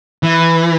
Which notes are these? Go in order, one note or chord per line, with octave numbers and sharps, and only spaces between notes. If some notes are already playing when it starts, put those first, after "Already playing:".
E3